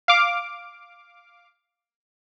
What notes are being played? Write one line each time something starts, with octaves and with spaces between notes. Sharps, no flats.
F5 D6